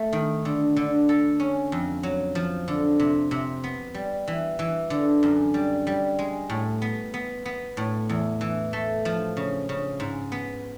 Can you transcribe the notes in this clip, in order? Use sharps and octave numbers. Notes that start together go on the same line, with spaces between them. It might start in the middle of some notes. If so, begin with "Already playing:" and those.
Already playing: A3
D#3
D3
D3
A4
C#4
F2
F#3
F3
D3
C3
C3
B3
G3
E3
E3
D3
F#2
G3
G3
G#3
A2
B3
B3
B3
A2
E2
E3
A3
F3
C#3
C#3
G#2
B3